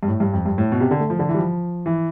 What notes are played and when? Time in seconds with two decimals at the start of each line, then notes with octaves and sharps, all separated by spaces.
0.03 G2
0.08 A2
0.20 G2
0.33 F2
0.46 G2
0.58 A2
0.72 B2
0.81 C3
0.91 D3
1.00 A3
1.10 F3
1.19 D3
1.29 E3
1.34 G3
1.38 F3
1.86 E3